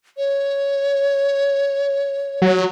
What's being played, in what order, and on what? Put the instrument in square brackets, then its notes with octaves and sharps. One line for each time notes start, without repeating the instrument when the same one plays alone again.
[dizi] C#5
[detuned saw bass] F#3